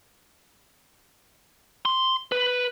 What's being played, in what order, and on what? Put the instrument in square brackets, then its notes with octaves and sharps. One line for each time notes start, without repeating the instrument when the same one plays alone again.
[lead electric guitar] C6
B4